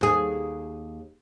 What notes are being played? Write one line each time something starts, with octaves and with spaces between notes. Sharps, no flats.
D#2 G#4